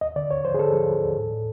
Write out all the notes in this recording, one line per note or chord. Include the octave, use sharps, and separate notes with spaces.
D#2 D#5
D3 D5
D#2 C#5
F3 C5
G#4
D3 A4
F3
F3
D#2
A2
A2